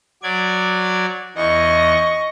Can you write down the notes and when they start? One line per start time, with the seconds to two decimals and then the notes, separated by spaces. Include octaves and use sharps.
0.23 F#3 D5 G#6
1.36 E2 D#5 C#6